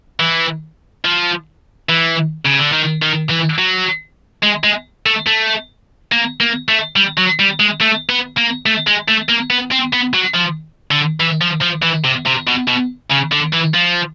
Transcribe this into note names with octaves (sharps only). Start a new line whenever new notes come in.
E3
F3
E3
C#3
D3
D#3
D#3
E3
F#3
G#3
G#3
A3
A3
A#3
A#3
A3
G3
F#3
G3
G#3
A3
B3
A#3
A3
G#3
A3
A#3
B3
C4
B3
F#3
F3
D3
E3
F3
F3
E3
C3
C3
B2
B2
C#3
D3
E3
F3